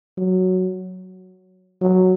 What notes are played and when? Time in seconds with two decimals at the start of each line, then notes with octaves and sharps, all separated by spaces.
0.18 F#3
1.81 F#3